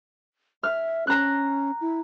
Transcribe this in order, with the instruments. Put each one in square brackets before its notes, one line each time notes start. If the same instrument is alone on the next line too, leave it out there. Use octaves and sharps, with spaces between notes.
[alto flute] E5 [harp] F6
[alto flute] C#4 [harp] A#5 F#6
[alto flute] E4